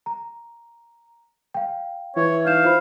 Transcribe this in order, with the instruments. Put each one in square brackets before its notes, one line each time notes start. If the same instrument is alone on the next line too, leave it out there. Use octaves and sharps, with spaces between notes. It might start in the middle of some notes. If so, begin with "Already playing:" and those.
[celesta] A#5
F5 G5
[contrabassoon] E3 [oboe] C#5
[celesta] D#4 G6 E7 [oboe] F5
[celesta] F4 C5 B5